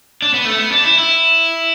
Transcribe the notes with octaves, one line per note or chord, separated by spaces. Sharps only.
D4
B3
A3
B3
D4
E4
E4